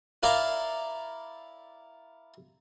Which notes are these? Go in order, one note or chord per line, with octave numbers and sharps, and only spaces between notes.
E4 A#4 D5 F5 A#5 C6